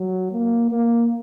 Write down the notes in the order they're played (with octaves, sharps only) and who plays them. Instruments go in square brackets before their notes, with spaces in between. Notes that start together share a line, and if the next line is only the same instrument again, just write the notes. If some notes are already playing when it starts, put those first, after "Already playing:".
Already playing: [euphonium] F#3
A#3
A#3